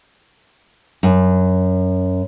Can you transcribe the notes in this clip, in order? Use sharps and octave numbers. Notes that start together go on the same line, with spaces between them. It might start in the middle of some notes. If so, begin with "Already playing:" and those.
F#2